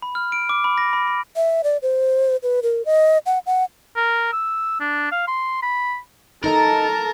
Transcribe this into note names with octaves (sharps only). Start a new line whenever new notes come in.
B5
F6
D7
D6
B5
A#6
B5
B5
E5
D5
C5
B4
A#4
D#5
F#5
F#5
A#4
E6
D4
F5
C6
B5
D#4 A4 A#4 D#5 A5 A#5